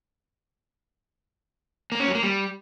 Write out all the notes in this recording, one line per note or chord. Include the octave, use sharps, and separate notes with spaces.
A#3
C#4
F#3
A#3
G3